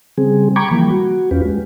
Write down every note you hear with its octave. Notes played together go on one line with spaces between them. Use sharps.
C#3 G3 C4 G#4
G5 A#5 B5 C#6 D6 G#6
E3 F3 G3 A#3
F#4
E2 C#4 F4 G4 B4
G#3